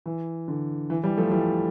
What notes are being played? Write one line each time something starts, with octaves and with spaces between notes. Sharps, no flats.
E3
D3
E3
E3 G3
F3 A3
E3 G3